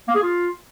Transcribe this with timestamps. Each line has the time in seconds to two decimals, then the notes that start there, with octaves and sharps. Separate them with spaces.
0.08 A#3
0.15 G#4
0.22 F4